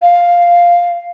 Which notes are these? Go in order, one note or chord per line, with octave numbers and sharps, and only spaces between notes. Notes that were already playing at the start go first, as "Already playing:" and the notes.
F5